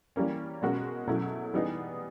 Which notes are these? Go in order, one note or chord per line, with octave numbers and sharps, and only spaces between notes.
E3 G3 A#3 C#4
B2 G#3 C#4 F#4 A#4
B2 F#3 A3 C#4 E4
E3 G3 B3 D#4 G#4